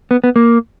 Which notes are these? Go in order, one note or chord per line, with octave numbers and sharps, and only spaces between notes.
B3
B3
A#3